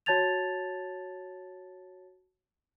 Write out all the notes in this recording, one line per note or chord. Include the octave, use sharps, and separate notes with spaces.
F#4 C#5 A5 G#6 A6 F7